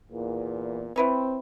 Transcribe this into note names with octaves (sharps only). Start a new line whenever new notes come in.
E2 A#2
C4 E4 B4 C#5